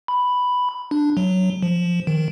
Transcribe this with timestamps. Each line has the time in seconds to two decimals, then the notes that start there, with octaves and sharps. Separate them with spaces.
0.08 B5
0.91 D4
1.17 F#3
1.62 F3
2.07 D#3